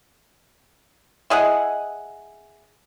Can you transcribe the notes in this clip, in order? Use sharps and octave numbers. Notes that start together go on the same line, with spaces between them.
E4 G#4 D#5 F#5